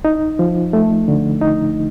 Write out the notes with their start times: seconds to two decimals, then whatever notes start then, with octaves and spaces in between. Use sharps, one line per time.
0.05 D#4
0.39 F3
0.73 A3
1.08 D3
1.42 D#4